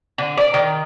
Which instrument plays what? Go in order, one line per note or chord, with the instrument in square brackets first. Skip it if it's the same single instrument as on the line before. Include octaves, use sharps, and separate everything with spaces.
[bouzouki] D3
D5
D#3